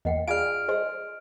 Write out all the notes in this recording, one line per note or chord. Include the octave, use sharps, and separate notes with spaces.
E2 A#3 D#5 F#5 G5
F4 G#4 D5 F5 G#5 D6 F6 D7
G#4 C5 D#5 C6 E6